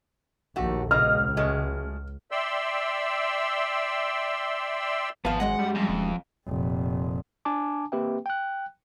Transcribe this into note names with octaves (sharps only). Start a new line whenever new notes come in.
A#1 D#2 A3 F#4 G4
C#2 B2 A#3 D#5 F6
F#3 G#3 A3
D5 E5 G5 C6 E6
G#1 F3 B3 F5
F#2 G#3 D#5 F#5
G3
F2
D#1
F1 A#2
D4 G#5 A5 D6
A#3 C4 G4 B4 E5 G5
G5 F#6